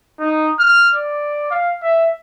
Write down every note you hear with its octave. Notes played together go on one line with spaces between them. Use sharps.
D#4
F6
D5
F5
E5